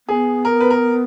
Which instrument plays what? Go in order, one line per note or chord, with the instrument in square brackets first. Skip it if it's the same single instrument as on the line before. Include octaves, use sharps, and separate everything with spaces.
[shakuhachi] B3 [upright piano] G#4
[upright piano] A#4
B4
A#4